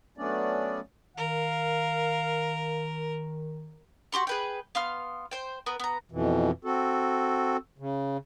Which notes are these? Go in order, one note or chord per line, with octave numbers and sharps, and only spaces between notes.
F#3 A3 B3 C#4 D4 D5
D#3 A#4 F5
F#4 G4 C6 C#6
G#4 B4 G5
B3 F5 C6 F6
C5 G5
B3 A#4 B4
B3 A#5
F2 B2 E3
C4 F#4 A4
C#3